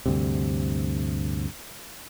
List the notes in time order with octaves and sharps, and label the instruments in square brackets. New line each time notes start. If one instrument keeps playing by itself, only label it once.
[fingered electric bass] D2 G2 C3